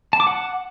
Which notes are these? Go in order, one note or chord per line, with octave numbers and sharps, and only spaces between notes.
A5
D6
F#5